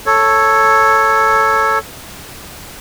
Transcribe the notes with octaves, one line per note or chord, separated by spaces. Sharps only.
A4 C#5